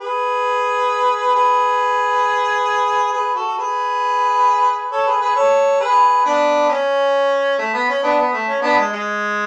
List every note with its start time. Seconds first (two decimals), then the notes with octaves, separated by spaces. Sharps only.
0.01 G#4 B4
1.35 G#4 B4
3.13 G#4 B4
3.35 F#4 A4
3.58 G#4 B4
4.91 A4 C#5
5.06 G#4 B4
5.21 G#4 B4
5.35 A4 C#5
5.80 G#4 B4
6.25 B3 D4
6.69 C#4
7.58 A3
7.74 B3
7.88 C#4
8.03 B3 D4
8.18 B3
8.33 A3
8.48 C#4
8.62 B3 D4
8.77 G#3
8.93 G#3